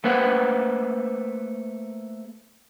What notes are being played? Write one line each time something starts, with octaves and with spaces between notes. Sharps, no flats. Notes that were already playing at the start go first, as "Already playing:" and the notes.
A3 A#3 B4 C5 F#5